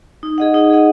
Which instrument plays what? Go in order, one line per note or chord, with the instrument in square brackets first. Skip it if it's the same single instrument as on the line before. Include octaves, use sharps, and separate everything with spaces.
[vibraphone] D#4
G#4 D#5 F#5
D#4
G#4 D#5 F#5